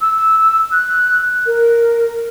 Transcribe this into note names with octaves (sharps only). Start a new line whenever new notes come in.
E6
F#6
A#4